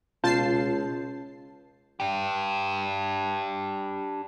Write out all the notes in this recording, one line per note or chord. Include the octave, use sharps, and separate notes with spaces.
C#2 B2 F4 A5 G6 C7
D4 G4